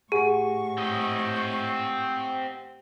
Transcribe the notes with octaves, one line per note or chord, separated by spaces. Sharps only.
A2 G4 G#4 F#5 G#5 C#6
C4 D#5